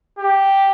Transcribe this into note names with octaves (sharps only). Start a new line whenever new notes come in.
G4